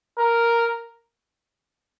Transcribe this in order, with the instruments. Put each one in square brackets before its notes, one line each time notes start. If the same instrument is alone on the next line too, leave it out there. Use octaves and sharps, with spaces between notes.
[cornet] A#4